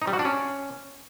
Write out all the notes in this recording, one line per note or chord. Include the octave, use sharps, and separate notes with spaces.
D#4
G3
F#4
D4
C#4